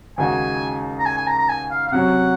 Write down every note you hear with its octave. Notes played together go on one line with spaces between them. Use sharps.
D#2 C#3 G#3 D#4 F#4 G#5
A#5
G#5
G#5
A#5
A#5
G#5
F5
F5
C3 F#3 C#4 F#5